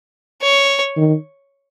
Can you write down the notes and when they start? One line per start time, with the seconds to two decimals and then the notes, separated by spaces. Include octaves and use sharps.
0.42 C#5
0.97 D#3